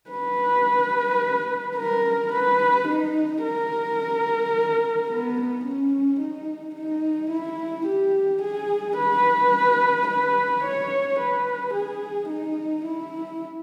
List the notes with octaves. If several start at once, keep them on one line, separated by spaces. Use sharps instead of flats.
B4
A#4
B4
D#4
A#4
B3
C#4
D#4
D#4
E4
G4
G#4
B4
B4
C#5
B4
G#4
D#4
E4